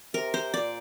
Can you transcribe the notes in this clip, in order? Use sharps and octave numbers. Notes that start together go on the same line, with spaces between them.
C3 A#4
C5
A#2 D5